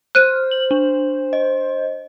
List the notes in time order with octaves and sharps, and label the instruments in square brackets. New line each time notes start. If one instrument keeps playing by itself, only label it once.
[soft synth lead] C5 [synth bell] F6 [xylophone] F#6 D#7
[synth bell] F#7
D4
D#5